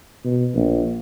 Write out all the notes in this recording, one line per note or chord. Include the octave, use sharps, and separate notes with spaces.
B2
A#1